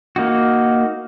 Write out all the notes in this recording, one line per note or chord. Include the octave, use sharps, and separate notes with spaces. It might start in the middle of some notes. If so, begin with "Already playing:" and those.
A#3 D#4 F#4